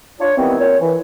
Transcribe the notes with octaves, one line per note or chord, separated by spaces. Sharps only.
D4 F4 C#5
D#3 E3 G3 B3 C4
A#2 C#5
E3